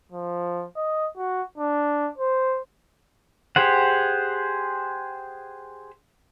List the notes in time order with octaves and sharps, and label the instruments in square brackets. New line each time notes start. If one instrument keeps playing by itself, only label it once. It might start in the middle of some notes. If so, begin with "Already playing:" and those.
[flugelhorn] F3
D#5
F#4
D4
C5
[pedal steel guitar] G4 G#4 C5 F#5